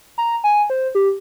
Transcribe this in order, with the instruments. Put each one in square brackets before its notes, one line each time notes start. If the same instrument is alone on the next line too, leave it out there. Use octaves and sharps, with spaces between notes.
[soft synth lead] A#5
G#5
C5
G4